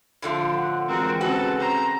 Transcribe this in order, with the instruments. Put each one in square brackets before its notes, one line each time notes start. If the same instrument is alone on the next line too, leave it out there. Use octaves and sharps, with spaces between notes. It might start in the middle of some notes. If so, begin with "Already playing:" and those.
[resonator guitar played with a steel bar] A2 D3 F3
[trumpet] F#5
[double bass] E3 G#3 [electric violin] C4 F#4 [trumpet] A#4
[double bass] C#3 C4 [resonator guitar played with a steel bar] F#4 [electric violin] A4 [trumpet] B4
[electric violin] C5 A#5